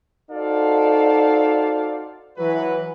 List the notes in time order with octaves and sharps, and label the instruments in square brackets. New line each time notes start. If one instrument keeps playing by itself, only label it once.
[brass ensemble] D#4 F#4 A4 C5 D5 F5
E3 F#3 B4